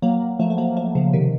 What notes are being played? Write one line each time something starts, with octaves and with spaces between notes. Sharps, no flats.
F#3 A#3
F3 A3
A3
F#3 A#3
F3 A3
C#3 F3
C3 D#3